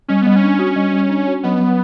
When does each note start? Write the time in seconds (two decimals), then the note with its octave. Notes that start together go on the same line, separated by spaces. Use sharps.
0.08 G3 C#4
0.22 G3 B3
0.36 C#4
0.43 D4
0.59 F#4
0.76 G3
0.93 G3
1.10 D4
1.27 F#4
1.43 F#3 B3
1.60 F#3